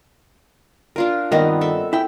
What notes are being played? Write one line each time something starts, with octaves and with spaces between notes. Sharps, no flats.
D4 F4 A#4
G2 D#3 B3 C4 A#4 D#5
A4 E5
E4 G5